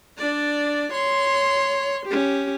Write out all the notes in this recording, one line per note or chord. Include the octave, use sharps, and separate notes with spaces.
D4 D5
C#5 C6
C#4 G4